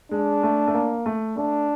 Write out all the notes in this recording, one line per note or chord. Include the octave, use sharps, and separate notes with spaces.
G#3 D4
A3
A3
A#3
A3
A3 D4